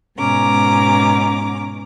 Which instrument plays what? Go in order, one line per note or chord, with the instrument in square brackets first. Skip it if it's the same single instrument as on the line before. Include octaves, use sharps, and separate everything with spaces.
[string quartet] G#2 B2 C#4 A#5 D6